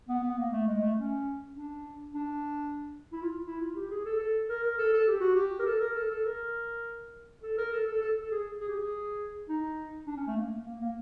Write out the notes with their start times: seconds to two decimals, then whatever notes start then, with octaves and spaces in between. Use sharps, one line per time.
0.09 B3
0.23 B3
0.38 A#3
0.53 A3
0.67 G#3
0.82 A3
0.97 C#4
1.55 D4
2.14 D4
3.12 E4
3.22 F4
3.47 E4
3.61 F4
3.76 G4
3.91 G#4
4.05 A4
4.19 A4
4.49 A#4
4.63 A#4
4.78 A4
4.93 A4
5.08 G4
5.21 F#4
5.35 G4
5.59 A#4
5.66 A4
5.80 A#4
5.95 A4
6.11 A4
6.25 A#4
7.43 A4
7.58 A#4
7.72 A4
7.87 A4
8.01 A4
8.21 A4
8.31 G#4
8.60 G#4
8.68 G4
8.75 G#4
9.49 D#4
10.07 D4
10.17 C#4
10.27 A3
10.37 A#3
10.66 A#3
10.81 A#3